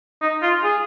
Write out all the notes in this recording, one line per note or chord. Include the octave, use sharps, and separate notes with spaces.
D#4
F4
G#4